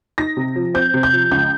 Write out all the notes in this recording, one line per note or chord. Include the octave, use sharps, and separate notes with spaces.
D#4 A#6
C3
F3
C4 G6
C3
G6
F3
C#2 G6